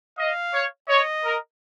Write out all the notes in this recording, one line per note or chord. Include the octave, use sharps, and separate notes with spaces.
D#5 F5
C#5
C#5 D#5
A#4